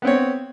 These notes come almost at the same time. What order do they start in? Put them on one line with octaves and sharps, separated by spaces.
B3 C4 C#5